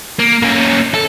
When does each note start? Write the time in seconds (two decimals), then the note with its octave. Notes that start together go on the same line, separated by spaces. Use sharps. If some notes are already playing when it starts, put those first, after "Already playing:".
0.19 A#3
0.42 A#3 C#4
0.94 A4